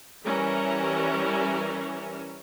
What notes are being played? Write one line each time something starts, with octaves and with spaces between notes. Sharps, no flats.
E3 G3 C#4 A#4 E5